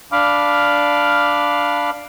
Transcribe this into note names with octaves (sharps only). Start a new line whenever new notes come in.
D4 F5 B5 D6 F6